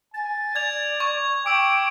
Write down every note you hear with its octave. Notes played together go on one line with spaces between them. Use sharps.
G#5 A6
D5 G#6 F7
C#6 G#6
G5 D6 E6 D7